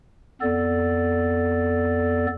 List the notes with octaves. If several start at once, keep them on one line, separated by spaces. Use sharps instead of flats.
F2 B3 A4 D5